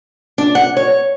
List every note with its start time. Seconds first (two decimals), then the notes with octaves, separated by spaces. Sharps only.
0.38 D4
0.55 F#5
0.77 C#5